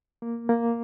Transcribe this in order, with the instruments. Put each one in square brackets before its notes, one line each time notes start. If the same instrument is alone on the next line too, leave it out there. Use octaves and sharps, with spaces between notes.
[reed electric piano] A#3
A#3